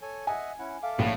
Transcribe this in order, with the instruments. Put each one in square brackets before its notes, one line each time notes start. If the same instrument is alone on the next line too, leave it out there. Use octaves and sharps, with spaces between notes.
[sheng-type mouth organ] A4 C#5 G#5
[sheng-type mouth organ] D#5 E5 F#5 [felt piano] G#5
[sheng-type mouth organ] C#4 E4 F#5
[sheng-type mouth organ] A4 E5 D6 [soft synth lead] F5
[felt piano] A#1 [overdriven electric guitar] A2 [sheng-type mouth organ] B3 B4